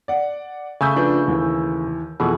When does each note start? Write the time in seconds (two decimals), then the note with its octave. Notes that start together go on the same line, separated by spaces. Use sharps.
0.08 D5 F#5
0.81 C#3 A3 E5 G#5 E6 G6
0.96 F3 D4 B4
1.28 D#2 E3
2.20 F2 B2 E3 A3 G#4